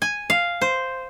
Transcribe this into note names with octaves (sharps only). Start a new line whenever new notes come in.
G#5
F5
C5